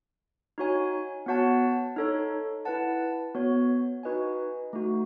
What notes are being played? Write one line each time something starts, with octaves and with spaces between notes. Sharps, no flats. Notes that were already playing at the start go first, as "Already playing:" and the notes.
D#4 F#4 C#5 G#5
B3 F#4 C#5 F#5 A5
D#4 A4 C#5
E4 B4 F#5 A5
B3 F#4 C#5
D#4 F#4 B4 D#5 G#5
A3 D#4 F#4